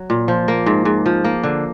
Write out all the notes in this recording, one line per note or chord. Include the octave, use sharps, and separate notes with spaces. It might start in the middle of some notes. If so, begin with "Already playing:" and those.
Already playing: F#3
A#2
F3
A#3
G#2
G#2
F3
A#3
D3